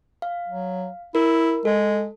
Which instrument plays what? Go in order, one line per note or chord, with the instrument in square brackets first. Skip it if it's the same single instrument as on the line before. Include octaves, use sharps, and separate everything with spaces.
[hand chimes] F5
[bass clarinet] F#3
[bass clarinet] E4 [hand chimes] A#4
[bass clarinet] G#3 [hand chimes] A4